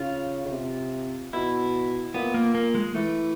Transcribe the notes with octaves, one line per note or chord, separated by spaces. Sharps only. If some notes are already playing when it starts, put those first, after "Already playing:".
Already playing: C#3 F4
C#3
C3
B2 E4
A#2 B3
A#3
A#3
G#3
E3 A3